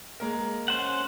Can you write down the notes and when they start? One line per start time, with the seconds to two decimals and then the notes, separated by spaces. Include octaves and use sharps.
0.20 G#3 A#3 A#4
0.68 C#4 C5 F#5